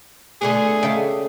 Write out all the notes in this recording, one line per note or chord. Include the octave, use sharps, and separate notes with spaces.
B2 D3 A3 G#4
C#3 A3 G4